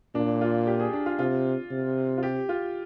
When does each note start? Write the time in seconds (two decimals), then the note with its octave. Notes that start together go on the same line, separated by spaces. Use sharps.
0.15 A#2 D4
0.41 F4
0.67 G4
0.79 G#4
0.93 D4
1.06 F4
1.19 C3 F4
1.71 C3
2.18 F4
2.23 G4
2.49 F4